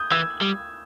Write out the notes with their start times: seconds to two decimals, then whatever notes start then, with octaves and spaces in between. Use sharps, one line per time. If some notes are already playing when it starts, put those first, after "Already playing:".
Already playing: D#6 G6 G#6
0.12 E3 E6 G#6
0.41 G3